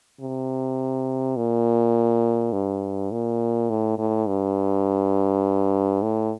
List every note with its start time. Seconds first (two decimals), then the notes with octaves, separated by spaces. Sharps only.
0.21 C3
1.37 A#2
2.53 G2
3.12 A#2
3.70 A2
3.98 A2
4.28 G2
6.02 A2